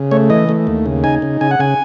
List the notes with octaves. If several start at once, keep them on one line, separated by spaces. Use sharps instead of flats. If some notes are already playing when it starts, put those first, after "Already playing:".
Already playing: C#3
A3 C#5
E3 D#5
A3
D#2
C#3
D#4 G#5
C#3
C#3 G#5
F#5
C#3 G#5